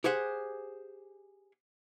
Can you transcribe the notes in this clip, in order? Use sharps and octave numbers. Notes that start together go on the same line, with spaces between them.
G4 G#4 C5 F#5